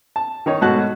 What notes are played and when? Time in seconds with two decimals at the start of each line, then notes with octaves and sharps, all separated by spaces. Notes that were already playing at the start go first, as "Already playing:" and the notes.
0.16 A5
0.46 D#3 D#4 C#5
0.61 G#2 B2 A3 F#4 A5 F#6